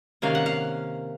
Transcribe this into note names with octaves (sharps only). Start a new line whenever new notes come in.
C3 D#3 A#3 C#4 F5
F#5
F5